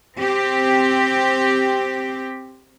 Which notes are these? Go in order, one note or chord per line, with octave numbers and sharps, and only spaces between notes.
C4 G4